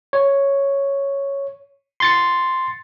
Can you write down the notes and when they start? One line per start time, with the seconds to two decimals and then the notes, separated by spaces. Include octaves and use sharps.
0.13 C#5
2.00 C6 A6 C#7